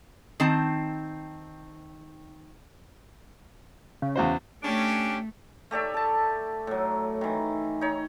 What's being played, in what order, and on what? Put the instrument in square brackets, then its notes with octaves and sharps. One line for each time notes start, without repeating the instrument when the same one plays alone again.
[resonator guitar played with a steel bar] D#3 C4 A5
[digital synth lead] C#3
[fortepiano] E2 F#4 C5
[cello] A3 [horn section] C#4 D4 G4
[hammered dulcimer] A3 G4 D5 E5
A4 A5
A2 F#3
D#3 E3
D#4 C#5